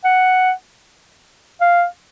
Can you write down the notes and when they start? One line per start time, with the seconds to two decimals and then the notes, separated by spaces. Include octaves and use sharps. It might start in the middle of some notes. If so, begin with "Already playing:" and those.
0.05 F#5
1.61 F5